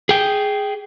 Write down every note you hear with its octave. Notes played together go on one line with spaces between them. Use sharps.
G#4 G5